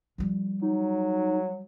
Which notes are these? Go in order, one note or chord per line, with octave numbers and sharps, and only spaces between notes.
F3 G3
F#3 D#4